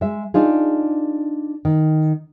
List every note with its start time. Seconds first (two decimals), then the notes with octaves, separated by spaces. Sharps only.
0.01 G#3 E5
0.34 D4 D#4 F4 G#4
1.65 D#3